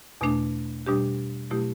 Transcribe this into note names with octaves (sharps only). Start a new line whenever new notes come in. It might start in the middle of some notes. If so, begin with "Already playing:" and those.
E2 B2 A3 D4
B2 G3 D4 G4
B2 F#3 A3 E4 G4